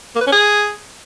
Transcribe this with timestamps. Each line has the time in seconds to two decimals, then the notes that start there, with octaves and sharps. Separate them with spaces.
0.15 A#3
0.21 B4
0.27 C#4
0.32 G#4